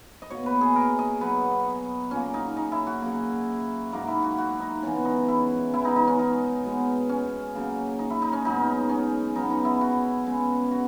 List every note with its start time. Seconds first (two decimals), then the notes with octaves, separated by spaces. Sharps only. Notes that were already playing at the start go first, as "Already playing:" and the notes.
0.22 D#5
0.30 B2 A#3 C#5
0.46 B4
0.61 G#4
0.76 A#4
0.99 D#5
1.21 B2 F#3 B3 B4
2.11 A#2 A#3 C#4
2.34 D#4
2.57 D#4
2.72 E4
2.87 F#4
3.02 C#3 F#3 A#3
3.93 G#2 F#3 A#3 D#4
4.07 E4
4.22 F#4
4.38 F#4
4.60 D#4
4.83 C#3 E3 G#3 B3 C#4
5.05 D#4
5.28 E4
5.73 C#3 E3 B3 E4
5.85 D#4
5.96 D#4
6.07 C#4
6.19 D#4
6.63 B2 G#3 B3
7.09 C#4
7.55 C#3 F#3 A#3
7.99 D#4
8.10 E4
8.22 D#4
8.33 C#4
8.44 G#2 F#3 B3 D#4
8.89 C#4
9.35 C#3 F#3 B3 D#4
9.50 D#4
9.65 E4
9.81 F#4
10.26 C#3 G#3 B3
10.71 F#4